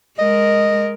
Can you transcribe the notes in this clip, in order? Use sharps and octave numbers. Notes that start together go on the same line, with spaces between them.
G#3 A#4 D#5